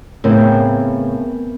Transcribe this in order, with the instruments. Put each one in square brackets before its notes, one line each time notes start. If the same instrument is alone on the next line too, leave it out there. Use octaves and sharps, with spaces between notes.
[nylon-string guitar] A2 C#3 [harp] B3 C4 A#4